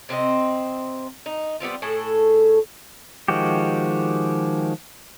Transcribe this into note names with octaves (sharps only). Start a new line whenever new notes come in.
C3 C4 F4 D#5
D#4
G3 B3 C4 F4
A2 G#4 A4
D#3 F3 G#3 F#4 G4